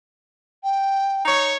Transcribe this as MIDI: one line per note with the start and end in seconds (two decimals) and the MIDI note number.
0.64 1.23 79
1.26 1.55 63
1.26 1.55 73